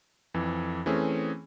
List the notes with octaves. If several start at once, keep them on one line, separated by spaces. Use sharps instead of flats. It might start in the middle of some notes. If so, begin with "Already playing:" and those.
F2 E3
E3 A3 C4 C#4 G#4